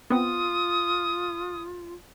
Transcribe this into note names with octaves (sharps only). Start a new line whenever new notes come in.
B3 C4 F4 D#6